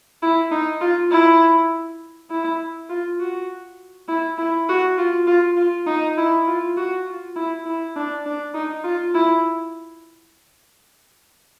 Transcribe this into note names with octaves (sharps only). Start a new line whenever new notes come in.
E4
D#4
F4
E4
E4
F4
F#4
E4
E4
F#4
F4
F4
F4
D#4
E4
F4
F#4
F4
E4
E4
D4
D4
D#4
F4
E4